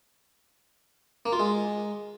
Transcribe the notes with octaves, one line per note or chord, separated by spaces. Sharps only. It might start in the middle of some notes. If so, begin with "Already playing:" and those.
A#3
F4
G#3